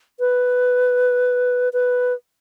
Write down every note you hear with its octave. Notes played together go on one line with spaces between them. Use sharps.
B4
B4